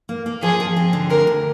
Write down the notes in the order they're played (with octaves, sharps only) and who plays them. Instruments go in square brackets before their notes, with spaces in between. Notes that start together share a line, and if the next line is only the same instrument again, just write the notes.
[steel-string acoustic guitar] A#3
A#3
[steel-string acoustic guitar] F3 [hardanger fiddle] G#4
[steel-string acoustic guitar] F3
C4
D3
[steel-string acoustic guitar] D2 [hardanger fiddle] A#4
[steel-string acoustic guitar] D2